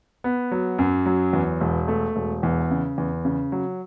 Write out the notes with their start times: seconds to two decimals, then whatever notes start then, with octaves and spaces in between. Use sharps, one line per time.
0.24 B3
0.52 F#3
0.78 F#2
1.06 F#3
1.33 E2
1.61 E1
1.88 A3
2.16 E1
2.43 E2
2.71 C#3
2.98 E2
3.25 C#3
3.52 F#3